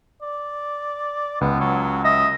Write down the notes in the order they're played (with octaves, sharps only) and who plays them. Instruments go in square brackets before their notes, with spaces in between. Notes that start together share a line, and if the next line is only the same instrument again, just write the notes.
[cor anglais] D5
[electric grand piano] C#2 [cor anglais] B3
[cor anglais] F#3
[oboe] D#5 [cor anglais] E5